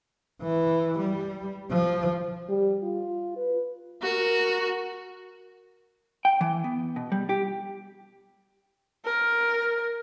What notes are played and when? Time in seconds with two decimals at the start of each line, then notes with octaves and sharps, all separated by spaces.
0.42 E3
0.99 G3
1.71 F3
2.49 G3
2.83 F4
3.36 B4
4.02 F#4 A#4
6.25 G5
6.41 E3
6.64 B3
6.96 B2
7.12 G3
7.29 G4
9.05 A#4